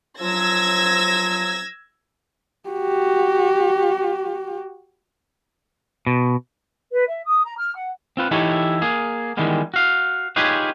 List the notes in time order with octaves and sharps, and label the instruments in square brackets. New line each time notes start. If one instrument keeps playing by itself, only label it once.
[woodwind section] F3 F#3 [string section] E6 G#6 A#6
[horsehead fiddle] F#4 G4
[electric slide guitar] B2
[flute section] B4
E5
D#6
A#5
F6
F#5
[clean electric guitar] C4 F4 B4
E3 D#4 E4 G4 A4 C#5
A#3 G#4
D#3 E3 G3 G#3 B3
F#4 F5
D#4 F4 G4 G#4 B4 C#5